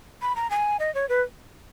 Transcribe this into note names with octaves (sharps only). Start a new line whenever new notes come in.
B5
A#5
G#5
D#5
C#5
B4